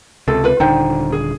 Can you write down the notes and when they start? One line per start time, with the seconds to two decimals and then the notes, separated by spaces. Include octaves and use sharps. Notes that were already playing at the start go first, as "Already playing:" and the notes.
0.28 C#2 C3 A4
0.44 F4 B4
0.60 D#1 D3 D#4 C5 G5
1.12 G#4